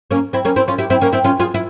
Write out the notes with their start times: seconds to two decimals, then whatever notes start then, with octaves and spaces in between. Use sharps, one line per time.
0.11 A#3 C#4
0.33 C4 E4
0.45 A#3 C#4
0.56 C4 E4
0.68 C#4 F4
0.78 E4 G4
0.90 C4 E4
1.01 A#3 C#4
1.13 C4 E4
1.24 C#4 F4
1.40 F4 G#4
1.54 E4